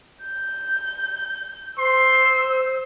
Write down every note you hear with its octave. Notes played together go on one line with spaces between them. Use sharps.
G6
C5 C6 E6